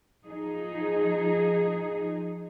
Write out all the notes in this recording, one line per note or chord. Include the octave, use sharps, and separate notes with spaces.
F3 D#4 G#4